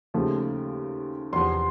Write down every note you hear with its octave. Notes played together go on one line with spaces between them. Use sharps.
D#2 C#3 F3 A3
E2 C3 F3 C6